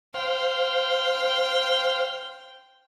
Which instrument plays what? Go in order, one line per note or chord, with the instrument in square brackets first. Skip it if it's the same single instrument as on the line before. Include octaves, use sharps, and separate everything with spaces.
[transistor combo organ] C5 F5 [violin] G5